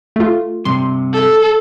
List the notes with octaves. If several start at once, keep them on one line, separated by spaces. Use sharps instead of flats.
A3 F4
G2 C3 C6
A4